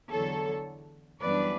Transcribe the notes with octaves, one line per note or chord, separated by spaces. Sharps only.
E2 D3 F#3 A4 C#5
F#2 E3 G3 B3 D4 B4 D5